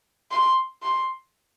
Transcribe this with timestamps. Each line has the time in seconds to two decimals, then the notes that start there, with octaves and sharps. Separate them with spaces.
0.31 C6
0.83 C6